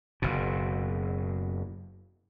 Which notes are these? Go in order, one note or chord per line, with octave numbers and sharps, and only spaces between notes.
F#1 B2